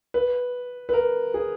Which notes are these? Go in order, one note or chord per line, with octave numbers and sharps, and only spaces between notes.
B4
B4
A#4
G#4